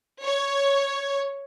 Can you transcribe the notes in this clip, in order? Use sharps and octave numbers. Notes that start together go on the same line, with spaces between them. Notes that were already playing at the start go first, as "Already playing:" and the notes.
C#5